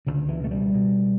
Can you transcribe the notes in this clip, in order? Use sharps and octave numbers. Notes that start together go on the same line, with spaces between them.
C#2 D3
E3
B2 A3
G3
B2